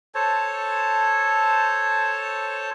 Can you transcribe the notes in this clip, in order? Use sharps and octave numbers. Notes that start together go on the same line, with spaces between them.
A4 C5 C#5 A5